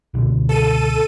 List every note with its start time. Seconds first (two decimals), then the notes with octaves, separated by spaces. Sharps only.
0.14 C#2 B2 D3
0.49 A4 D#7